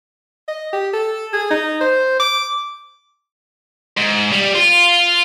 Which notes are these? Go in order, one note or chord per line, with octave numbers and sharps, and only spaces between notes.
D#5
G4
A4
G#4
D#4
C5
D6
G#2
G3
F4